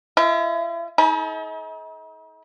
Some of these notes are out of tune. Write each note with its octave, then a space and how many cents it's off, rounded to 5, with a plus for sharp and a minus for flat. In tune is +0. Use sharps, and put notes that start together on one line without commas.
E4 +45 E5 -40
D#4 +40 A4 -45 B5 -20